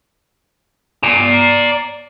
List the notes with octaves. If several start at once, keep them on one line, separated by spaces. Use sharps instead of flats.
D5 A#5